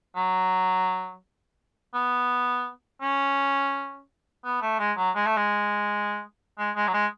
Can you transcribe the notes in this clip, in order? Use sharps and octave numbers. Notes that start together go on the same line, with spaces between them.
F#3
B3
C#4
B3
A3
G#3
F#3
G#3
A3
G#3
G#3
G#3
F#3
G#3